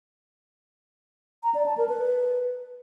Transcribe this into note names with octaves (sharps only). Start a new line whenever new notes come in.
A#5
D5
A5
A#4
B4